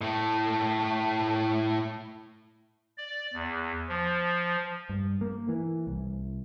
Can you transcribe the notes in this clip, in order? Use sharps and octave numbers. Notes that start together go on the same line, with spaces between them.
A2 A3
D5
E2
F3
G2
A#3
E3
C2